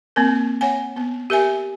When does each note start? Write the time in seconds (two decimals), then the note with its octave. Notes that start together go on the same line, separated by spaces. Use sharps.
0.16 A#3 C4 A#4
0.61 C#5 F#5 G#5
0.96 B3
1.30 G4 A#4 E5 G#5